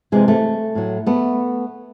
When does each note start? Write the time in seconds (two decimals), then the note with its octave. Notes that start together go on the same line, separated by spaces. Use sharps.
0.12 F2 C3 E3 G#3
0.28 A3
0.75 A2 F#3
1.06 A3 B3